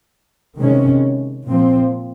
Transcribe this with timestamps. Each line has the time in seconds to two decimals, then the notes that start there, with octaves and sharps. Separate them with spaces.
0.58 C3 D#3 G#3 C#4
1.45 A#2 F3 C4